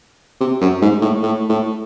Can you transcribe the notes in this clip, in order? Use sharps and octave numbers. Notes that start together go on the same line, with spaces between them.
C3
F#2
G#2
A2
A2
A2